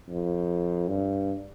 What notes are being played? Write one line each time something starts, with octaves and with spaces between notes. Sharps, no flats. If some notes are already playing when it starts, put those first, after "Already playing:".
F2
G2